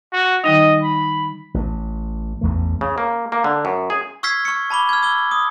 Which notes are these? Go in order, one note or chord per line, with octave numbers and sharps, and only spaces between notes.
F#4
D#3 G3 D#4 D#5
B5
A1
A1 E2 A3
C#3
A#3
A#3
D3
F#2
G#4
C#6 E6 F6 G#6 B6 C7
C#6 C#7
A5 B5 D6 G7
F6 G#6
E6 G#6 G7
D#6